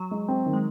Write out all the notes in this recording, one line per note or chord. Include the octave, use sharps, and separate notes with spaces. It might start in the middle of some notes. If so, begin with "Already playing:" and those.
Already playing: F#3
G#3
C4
D#3
G#3